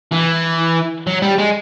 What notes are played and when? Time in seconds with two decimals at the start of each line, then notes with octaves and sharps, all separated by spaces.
0.11 E3
1.07 F#3
1.22 G3
1.38 G#3